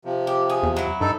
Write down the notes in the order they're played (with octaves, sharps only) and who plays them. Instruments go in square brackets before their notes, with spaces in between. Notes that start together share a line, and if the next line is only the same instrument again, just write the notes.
[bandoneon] C3 F3
[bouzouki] G4
G#4
[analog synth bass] E2
[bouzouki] F#3 E4
[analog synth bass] G2 [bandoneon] D#4 A4